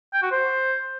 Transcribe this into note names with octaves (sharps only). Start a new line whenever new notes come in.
G5
F#4
C5